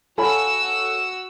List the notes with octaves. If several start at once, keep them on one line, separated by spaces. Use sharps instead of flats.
F4 F#4 A4 C#5 G#5 B5 E6